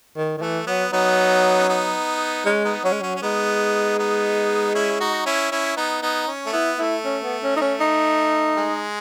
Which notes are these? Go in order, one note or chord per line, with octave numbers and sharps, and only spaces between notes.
D#3
D#3
E3 A3
F#3 B3
F#3 B3 D#4
C#4
B3 D#4
G#3 C#4
B3 D#4
F#3 C#4
G#3
F#3 C#4
C#4
G#3 B3 D#4
B3 D#4
C#4 E4
D#4 F#4
C#4 E4
C#4 E4
B3 D#4
B3 D#4
C#4
A3
B3 E4
A3 E4
C#4
B3
C#4
D#4
C#4
D#4
G#3